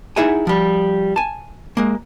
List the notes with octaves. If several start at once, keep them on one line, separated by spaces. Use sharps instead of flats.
D#4 E4 G#4 E5 F#5 G#5
F3 G3
G#5 A5
G#3 A#3